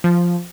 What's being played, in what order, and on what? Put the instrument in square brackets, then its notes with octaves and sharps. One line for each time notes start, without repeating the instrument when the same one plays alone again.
[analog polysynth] F3